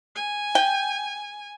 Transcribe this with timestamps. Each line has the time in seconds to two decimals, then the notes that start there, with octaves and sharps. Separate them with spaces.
0.15 G#5
0.55 G5